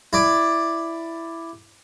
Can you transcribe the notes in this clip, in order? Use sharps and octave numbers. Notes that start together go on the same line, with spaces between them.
E4 D5